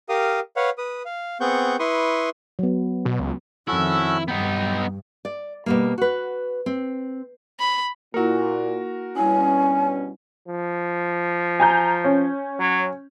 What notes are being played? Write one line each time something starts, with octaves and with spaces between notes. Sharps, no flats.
G4 A#4 F5 D#6
B4 C#5 F5 F#5
B4 D#6
F5
B3 C4 G#4 F#5 C#6 G6
E4 B4 C6 C#6 D#6
F#3 B3
B2
C#2
F2 D#3 C#4 E4 F#4 A4
G2 B3 D#4 G5
D5
B2 G3 A#3
F#4 B4
C4
B5
A#2 A#3 E4 F#4 A#4
G2 B2 G3 C#4 E4 G#5
F3
G#5 A#5 G6
C#4
F#3